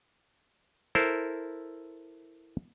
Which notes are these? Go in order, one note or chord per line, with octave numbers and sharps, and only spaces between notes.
E4 A4 A#4 C5